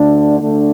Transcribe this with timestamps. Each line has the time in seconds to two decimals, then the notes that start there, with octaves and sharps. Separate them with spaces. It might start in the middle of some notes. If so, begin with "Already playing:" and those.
Already playing: D2 D3 A3 D4
0.39 D2 D3 A3 D4